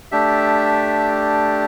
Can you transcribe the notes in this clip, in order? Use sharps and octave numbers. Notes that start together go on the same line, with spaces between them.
A3 D4 G4 E5